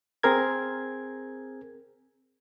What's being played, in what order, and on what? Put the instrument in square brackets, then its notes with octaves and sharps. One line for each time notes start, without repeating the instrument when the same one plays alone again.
[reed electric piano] C4 G#4 A#4 G#6